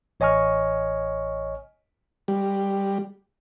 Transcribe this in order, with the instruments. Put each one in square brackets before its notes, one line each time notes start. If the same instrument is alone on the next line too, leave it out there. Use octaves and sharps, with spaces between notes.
[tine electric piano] A1 C#5 D#5 G#5 C#6 F6
[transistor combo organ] G3